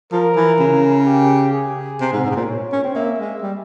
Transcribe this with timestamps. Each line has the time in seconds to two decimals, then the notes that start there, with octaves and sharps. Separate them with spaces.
0.12 F3 A#4
0.36 E3
0.59 C#3
1.06 G4
1.53 G#4
2.01 C3
2.12 G#2
2.24 G#2
2.31 C3
2.35 A#2
2.47 C#5
2.72 C#4
2.84 C4
2.95 A#3 E5
3.18 G#3
3.41 G3